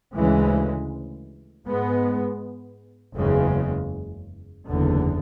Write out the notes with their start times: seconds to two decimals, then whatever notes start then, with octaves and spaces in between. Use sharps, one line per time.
0.15 D2 C#3 E3 G#3
1.66 G#2 G#3 B3
3.16 F#1 E2 C#3 G#3
4.67 F#1 E2 D3